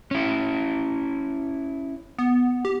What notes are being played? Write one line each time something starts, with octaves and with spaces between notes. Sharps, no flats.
C#4 E4
B3
G4